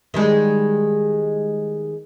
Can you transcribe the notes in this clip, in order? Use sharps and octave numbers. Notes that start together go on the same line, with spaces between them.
D#3 G3 G#3